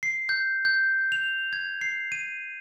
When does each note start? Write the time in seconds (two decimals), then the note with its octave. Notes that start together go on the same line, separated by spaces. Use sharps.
0.03 C7
0.29 G6
0.65 G6
1.12 F7
1.53 G#6
1.81 C7
2.12 D#7